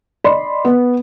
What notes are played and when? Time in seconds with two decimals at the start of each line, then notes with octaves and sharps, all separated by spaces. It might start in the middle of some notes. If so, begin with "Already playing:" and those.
0.24 D5 D#5 B5 C6
0.65 B3